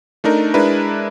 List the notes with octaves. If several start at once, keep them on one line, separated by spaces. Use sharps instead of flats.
A3 D4 D#4 A#4
G#3 D4 E4 A#4 B4